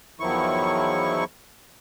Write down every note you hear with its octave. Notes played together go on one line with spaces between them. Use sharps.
E2 D#3 F3 F#3 E4 C#6